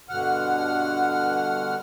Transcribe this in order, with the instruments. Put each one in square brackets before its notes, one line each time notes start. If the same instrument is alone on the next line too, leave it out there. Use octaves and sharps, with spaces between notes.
[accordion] G2 B2 D3 F#5 F6